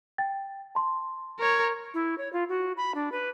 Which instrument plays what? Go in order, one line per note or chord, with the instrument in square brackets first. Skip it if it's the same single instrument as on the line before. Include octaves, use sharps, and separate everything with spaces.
[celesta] G5 A6
A5 C6
[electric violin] A#4 C#5
[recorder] E4
C#5
F4
F#4
B5
D4
B4